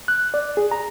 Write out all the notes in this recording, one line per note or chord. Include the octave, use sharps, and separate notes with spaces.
F#6
D5
G#4
A#5